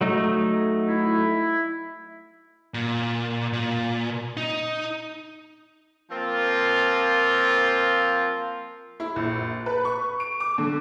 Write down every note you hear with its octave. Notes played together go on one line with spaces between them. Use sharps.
F#3 A3 D#4
E4
A#2
A#2
D#4
F3 A#3 C4 F4
E4
A#1
B4
C#6
D7
D6
D3